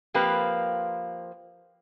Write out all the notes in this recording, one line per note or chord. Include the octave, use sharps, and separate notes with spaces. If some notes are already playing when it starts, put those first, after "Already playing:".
F3 A#3 C4 G4 B4